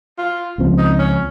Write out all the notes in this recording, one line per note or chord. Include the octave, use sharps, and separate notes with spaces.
F4
C#2 C#3 F3 C4
D#4
C#4